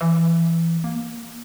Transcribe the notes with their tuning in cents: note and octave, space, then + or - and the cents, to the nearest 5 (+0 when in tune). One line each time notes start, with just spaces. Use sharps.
E3 +15
A#3 +10